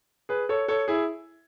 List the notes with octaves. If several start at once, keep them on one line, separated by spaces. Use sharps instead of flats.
G#4 B4
A4 C#5
A4 C#5
E4 G#4